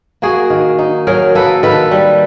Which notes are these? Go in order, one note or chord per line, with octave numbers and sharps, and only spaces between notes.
A#3 F#4 G#4
D#3
D#4
F#3 G#4 A#4
A#3 A4 B4
D#3 A4 B4
G3